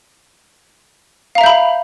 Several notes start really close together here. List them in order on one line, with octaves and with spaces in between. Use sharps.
F5 A#5 E5 G6 B5